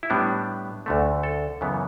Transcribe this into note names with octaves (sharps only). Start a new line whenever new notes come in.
E4
A2 G3 B3 D4
D2 D3 A3
A4
F#2 C#3 E3 B3